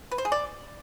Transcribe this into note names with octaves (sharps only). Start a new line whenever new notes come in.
B4
C5
G#4
D5